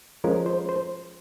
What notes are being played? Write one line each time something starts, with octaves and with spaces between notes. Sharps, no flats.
F3 G#3 C#4 A#4
C5
C5